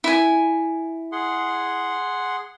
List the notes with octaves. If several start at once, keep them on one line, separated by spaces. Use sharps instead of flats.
E4 G#5
G#4 F#5 C6